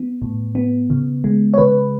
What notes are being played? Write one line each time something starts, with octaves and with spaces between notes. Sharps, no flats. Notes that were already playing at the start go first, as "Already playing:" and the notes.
Already playing: B3
A2
B3
C#3
G#3
C#5
C#3 B4